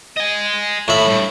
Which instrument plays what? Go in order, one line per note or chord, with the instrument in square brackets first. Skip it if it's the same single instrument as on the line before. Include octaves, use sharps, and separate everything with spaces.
[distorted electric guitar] D#5 G#5
[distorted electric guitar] D#2 B5 [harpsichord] A2 E5
[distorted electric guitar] G2